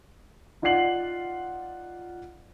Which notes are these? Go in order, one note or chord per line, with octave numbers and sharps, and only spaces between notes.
D#4 F4 D5 F#5 C7 F#7